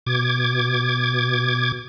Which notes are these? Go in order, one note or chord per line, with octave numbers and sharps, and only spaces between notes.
B2 D6 G#6